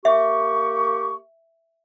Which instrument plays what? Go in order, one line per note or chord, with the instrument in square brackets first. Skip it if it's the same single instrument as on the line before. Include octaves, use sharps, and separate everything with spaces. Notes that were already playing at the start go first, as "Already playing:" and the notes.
[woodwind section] A#3 G4 C#6 [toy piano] E5